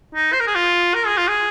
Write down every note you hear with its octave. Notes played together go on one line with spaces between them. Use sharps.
D#4
C5
A#4
G#4
F4
A#4
G#4
F4
G#4